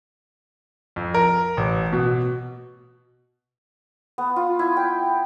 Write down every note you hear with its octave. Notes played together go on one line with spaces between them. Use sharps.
F2
A#4
A1
B2
B3
F4
E4
G5